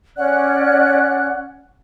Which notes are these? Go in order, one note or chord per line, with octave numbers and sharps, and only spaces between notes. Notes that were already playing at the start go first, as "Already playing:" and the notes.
C#4 D5 F#5 F#6